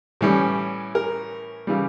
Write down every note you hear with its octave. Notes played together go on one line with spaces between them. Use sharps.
A2 E3 G3 C#4
A#4
C#3 E3 G3